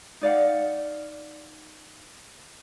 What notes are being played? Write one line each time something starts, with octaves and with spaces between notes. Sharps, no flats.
D#4 D5 F5 F#5